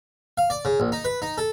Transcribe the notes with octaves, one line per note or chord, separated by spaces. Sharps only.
F5
D5
C#3
A#1
D#4
B4
D#4
A4